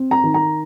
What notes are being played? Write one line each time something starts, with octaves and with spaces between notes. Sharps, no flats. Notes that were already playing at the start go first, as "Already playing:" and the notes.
Already playing: C4
A#5
D#3
A#5